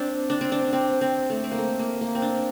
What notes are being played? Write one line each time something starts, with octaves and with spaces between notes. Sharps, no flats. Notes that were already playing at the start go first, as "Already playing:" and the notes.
Already playing: C4 D4
D4
C4
D4
C4
C4
A3
C4
A#3
A3
A#3
A#3
C4
D4